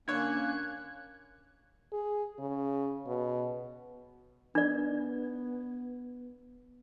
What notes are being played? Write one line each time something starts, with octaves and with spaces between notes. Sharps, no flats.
D3 A#3 C#4 C#5 F#6 G#6
G#4
C#3
B2
B3 D4 D5